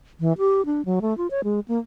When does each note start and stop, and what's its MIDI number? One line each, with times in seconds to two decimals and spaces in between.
0.20 0.33 52
0.38 0.65 67
0.66 0.84 62
0.85 0.99 54
1.02 1.16 57
1.18 1.27 65
1.31 1.41 73
1.44 1.60 56
1.68 1.79 58